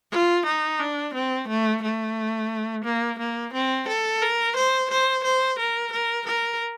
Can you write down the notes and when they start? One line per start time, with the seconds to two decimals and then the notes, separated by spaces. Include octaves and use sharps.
0.11 F4
0.46 D#4
0.79 D4
1.14 C4
1.48 A3
1.82 A3
2.85 A#3
3.19 A#3
3.53 C4
3.88 A4
4.22 A#4
4.56 C5
4.90 C5
5.24 C5
5.59 A#4
5.93 A#4
6.27 A#4